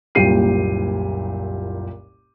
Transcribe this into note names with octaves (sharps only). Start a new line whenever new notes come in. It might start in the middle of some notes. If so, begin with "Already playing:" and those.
F#1 C2 A#2 G4 C7 D#7